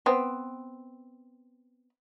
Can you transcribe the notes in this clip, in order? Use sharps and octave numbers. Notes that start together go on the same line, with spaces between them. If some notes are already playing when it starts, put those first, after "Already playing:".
B3 C4